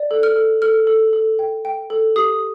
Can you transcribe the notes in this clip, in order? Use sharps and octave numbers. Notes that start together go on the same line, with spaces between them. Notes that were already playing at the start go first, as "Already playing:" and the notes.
Already playing: D5
A4
F6
A4
A4 F6
A4
A4
G5
G5
A4
G4 D#6